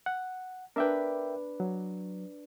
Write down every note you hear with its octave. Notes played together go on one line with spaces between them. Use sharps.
F#5
D4 A#4 B4 E5 G5
F#3